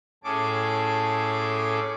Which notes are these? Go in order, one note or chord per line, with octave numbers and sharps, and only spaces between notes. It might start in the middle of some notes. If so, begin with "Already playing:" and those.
A2 C#4 G#4 A4 D6